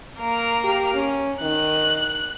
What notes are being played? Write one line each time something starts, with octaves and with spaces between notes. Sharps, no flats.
A#3 A#4
G4
C#4
D#3 F#6